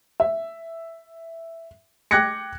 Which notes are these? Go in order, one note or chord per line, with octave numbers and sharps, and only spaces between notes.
E5
G5 D6 F#6 G#6 A#6 C#7